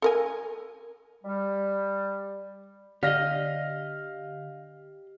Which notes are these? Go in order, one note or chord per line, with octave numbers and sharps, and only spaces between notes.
A4 A#4 G#5
G3
D3 G4 D5 D#5 F5 F6 A#6